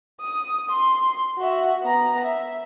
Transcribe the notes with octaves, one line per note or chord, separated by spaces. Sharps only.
D#6
C6
F#4 E5
B3 A#5
E5